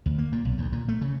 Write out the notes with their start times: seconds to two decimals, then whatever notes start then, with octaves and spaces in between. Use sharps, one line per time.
0.06 D2
0.18 A#3
0.32 A#2
0.45 B1
0.58 D2
0.72 A#2
0.88 A3
1.01 C#3